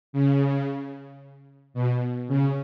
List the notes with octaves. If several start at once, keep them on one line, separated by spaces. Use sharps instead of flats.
C#3
B2
C#3